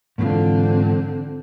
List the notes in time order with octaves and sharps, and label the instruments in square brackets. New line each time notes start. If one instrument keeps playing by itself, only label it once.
[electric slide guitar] G#2 E3 F4 [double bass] D3 C4